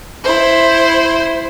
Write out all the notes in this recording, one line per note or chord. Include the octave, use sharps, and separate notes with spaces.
E4 C5